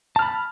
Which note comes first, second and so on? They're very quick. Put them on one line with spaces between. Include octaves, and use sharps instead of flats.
A5 F6 B5